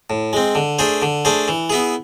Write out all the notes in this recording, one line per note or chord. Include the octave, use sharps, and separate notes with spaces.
A2
G#3 C4
D3
A3 D4 G#4 C5
D3
A3 D4 G#4 C5
E3
B3 E4 G#4